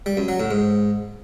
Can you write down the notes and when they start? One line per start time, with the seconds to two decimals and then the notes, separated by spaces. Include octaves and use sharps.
0.06 G3
0.17 F#2
0.28 F#3
0.40 A2
0.51 G#2